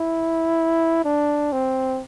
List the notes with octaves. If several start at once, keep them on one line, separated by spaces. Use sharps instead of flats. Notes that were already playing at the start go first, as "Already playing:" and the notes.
Already playing: E4
D4
C4